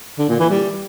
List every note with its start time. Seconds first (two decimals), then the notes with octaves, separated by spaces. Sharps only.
0.18 D3
0.29 A#2
0.39 E3
0.50 G3